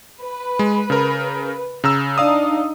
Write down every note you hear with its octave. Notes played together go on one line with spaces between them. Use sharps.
B4
G#3
C#3 A#4
C#3 A#5 E6
D4 D#4 F5 D#6